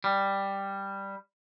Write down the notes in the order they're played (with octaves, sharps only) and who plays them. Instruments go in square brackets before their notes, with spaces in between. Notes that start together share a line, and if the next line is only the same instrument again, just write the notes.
[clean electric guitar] G3